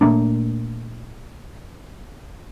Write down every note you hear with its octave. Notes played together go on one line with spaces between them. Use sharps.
A#2 A3 A#3 D4